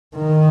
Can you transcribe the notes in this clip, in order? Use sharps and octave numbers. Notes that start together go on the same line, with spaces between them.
D#3